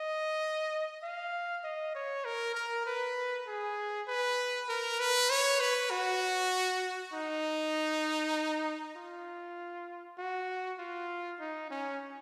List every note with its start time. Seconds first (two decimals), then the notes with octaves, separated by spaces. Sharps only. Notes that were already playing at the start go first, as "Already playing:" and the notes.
Already playing: D#5
1.03 F5
1.64 D#5
1.95 C#5
2.25 A#4
2.55 A#4
2.86 B4
3.47 G#4
4.08 B4
4.69 A#4
5.00 B4
5.30 C#5
5.60 B4
5.91 F#4
7.13 D#4
8.96 F4
10.18 F#4
10.79 F4
11.40 D#4
11.70 C#4